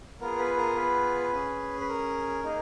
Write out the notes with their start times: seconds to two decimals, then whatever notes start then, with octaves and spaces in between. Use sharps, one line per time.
0.21 B3 F4 G#4 A#4
0.38 B4
0.57 A#4
0.76 B4
1.33 C#4 G#4
1.80 B4
1.89 A#4
2.44 A#3 D#4 G#4